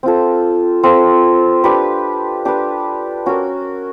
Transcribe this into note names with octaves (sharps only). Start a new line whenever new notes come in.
C4 F4 A4
C4 F4 A4
D4 G4 B4
D4 G4 B4
C#4 F#4 A#4